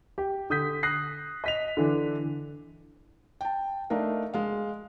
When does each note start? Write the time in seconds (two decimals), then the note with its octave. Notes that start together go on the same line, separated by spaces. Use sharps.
0.18 G4
0.50 D3 D#6 G6 B6
0.83 D#6 F#6 A#6 C7
1.44 D#5 B6 F7
1.77 D3 E3 D4
3.41 G5 A5
3.90 A3 D4 D#4 A#4 F5
4.34 G#3 F5